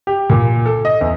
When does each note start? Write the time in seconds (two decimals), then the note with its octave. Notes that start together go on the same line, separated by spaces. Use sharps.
0.07 G4
0.30 A#2
0.66 A4
0.85 D#5
1.01 E2